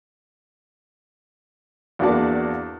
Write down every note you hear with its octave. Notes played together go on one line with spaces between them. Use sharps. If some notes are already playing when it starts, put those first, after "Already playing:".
E2 A#3 D4 F#4 D5 A5